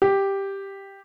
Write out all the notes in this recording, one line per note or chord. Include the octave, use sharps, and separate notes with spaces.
G4